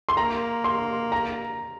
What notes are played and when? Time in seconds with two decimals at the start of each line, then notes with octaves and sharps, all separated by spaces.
0.09 C6
0.17 A#3 A#5
0.64 C6
1.12 A#5